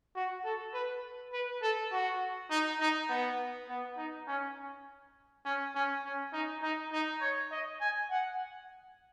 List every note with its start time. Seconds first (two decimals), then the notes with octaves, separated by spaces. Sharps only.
0.16 F#4
0.45 A4
0.73 B4
1.32 B4
1.62 A4
1.92 F#4
2.51 D#4
2.81 D#4
3.09 B3
3.69 B3
3.98 D#4
4.28 C#4
5.45 C#4
5.75 C#4
6.05 C#4
6.33 D#4
6.63 D#4
6.93 D#4
7.21 C#5
7.52 D#5
7.81 G#5
8.11 F#5